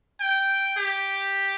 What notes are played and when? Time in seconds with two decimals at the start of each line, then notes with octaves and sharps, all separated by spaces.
0.21 G5
0.78 G4